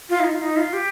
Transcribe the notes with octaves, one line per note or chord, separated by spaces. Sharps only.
F4
D#4
F4
D#4
F4
G4